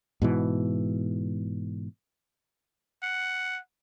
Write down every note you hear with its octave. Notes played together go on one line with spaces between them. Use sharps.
G#2 B2 E3
F#5